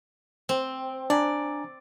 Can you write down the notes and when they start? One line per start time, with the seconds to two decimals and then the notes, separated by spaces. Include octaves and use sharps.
0.49 C4
1.10 D4 D5 G#5 A#5